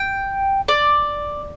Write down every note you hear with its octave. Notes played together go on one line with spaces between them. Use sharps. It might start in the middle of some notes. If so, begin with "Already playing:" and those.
Already playing: G5
D5